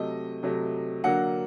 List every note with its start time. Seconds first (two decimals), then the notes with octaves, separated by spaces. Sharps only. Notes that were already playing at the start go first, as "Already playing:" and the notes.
Already playing: C3 F#3 A3 D#5
0.43 C3 F#3 A3
1.04 D3 F#3 A#3 F#5